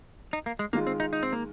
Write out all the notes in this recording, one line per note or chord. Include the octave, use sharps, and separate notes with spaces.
D#4
A#3
G#3
D#3 G#3 A#3 F4
C4
D#4
D#4
C4
A#3